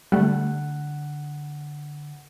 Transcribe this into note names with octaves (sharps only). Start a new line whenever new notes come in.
D3 G3 A3 F#5